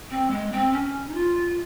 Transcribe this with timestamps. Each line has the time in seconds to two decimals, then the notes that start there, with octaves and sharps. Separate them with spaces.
0.11 C4
0.30 G#3
0.52 C4
0.72 C#4
1.09 D#4
1.15 F4